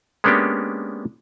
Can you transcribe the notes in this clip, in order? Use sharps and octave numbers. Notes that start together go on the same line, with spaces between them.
G#3 A#3 B3 C#4 D4 G4